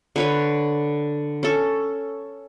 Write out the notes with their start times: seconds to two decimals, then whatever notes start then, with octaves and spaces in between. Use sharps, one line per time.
0.16 D3 B4 C#5
1.43 C#4 A4